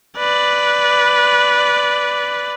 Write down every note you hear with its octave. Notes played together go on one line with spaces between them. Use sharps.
B4 D5